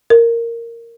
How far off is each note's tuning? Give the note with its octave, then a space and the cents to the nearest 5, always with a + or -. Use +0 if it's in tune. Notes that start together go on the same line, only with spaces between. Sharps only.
A#4 -10